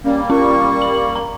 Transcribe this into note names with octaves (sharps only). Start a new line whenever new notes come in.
G3 A#3 C#4
C#4 A#4 C#6
F#7
A#5